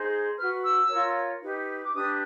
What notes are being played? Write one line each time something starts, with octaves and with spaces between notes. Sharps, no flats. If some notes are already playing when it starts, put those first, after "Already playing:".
Already playing: D#4 G#4 C5
F#4 B4 F6
E6
F4 A#4 C#5
D#4 G4 B4
D6
D4 G4 B4 D#6